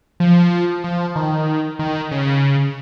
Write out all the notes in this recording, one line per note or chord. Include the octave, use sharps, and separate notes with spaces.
F3
F3
D#3
D#3
C#3